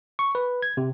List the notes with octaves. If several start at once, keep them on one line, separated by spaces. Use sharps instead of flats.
C#6
B4
G#6
C3